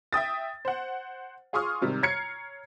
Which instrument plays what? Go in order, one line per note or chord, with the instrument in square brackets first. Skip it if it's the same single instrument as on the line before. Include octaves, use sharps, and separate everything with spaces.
[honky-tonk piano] E5 G5 D#6 A6
C5 F#5
F4 G#4 C6 C#6 D#6 F6
G#2 C3 D#3 G3
C#5 A#5 F6 G#6 C7 C#7